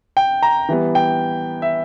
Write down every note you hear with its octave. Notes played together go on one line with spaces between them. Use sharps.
G5
A#5
E3 G3 B3
G5
E5